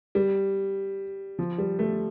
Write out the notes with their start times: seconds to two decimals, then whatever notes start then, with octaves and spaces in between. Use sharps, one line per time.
0.15 G3
1.39 F3
1.58 G3
1.79 A3